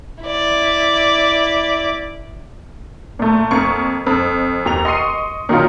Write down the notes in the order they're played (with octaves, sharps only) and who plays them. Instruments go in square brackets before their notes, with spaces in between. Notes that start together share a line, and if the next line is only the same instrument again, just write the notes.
[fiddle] E4 D5
[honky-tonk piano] A#2 A3
F2 A#3 C#6
F2
D#2 A#5 F7
D#5 C6 C#6 C7 D#7
A#2 D#3 F#3 C#4 D#4 F4